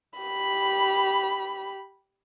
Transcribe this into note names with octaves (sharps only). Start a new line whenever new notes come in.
G4 B5